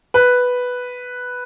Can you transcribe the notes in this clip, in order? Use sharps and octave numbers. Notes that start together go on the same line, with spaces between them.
B4